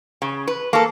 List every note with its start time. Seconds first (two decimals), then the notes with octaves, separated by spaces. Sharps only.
0.22 C#3
0.48 B4
0.73 A#3 A4